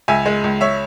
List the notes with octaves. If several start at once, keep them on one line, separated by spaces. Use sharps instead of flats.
C#2 E5 G#5
G#3
C#2
C#5 E5